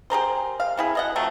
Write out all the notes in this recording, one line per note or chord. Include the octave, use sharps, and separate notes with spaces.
G4 G#4 A#4 C5
F5
C3 E4 G#4
B2 D#5 F#5
F3 F#3 A3 C4